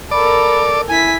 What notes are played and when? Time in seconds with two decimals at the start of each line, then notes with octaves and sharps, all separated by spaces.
0.11 A4 A#4 D5 B5
0.89 E4 G#5 B6